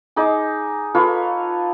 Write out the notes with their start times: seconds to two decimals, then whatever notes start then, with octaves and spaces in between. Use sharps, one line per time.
0.16 D#4 G#4 D6
0.95 F4 A4 B4 C#5